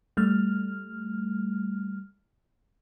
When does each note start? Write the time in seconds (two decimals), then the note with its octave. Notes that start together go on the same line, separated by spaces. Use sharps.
0.17 G3 A3 F6